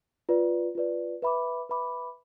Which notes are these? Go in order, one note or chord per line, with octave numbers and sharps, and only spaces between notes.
F4 B4 D5
F4 B4 D5
B4 E5 B5 D6
B4 E5 B5 D6